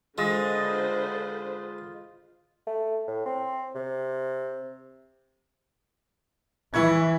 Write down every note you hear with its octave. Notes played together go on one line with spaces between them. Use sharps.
D3 G#3 F4 B4 C5 D#5
A3
A2
C4
C3
E3 E4 C#6 G#6